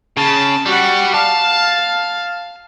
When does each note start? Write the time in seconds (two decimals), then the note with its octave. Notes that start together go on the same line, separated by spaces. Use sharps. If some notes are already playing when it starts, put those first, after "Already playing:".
0.17 C#3 A5
0.66 G3 F#4 F#5
1.14 F5 A5